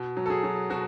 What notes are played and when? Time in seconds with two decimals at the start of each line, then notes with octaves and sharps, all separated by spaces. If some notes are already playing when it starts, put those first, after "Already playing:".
Already playing: B2
0.17 F#3
0.26 A4
0.30 G#4
0.44 F#3
0.70 B2 F#4